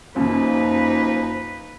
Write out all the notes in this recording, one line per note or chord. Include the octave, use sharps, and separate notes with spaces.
F#2 C#3 F3 A#3 D#4 B4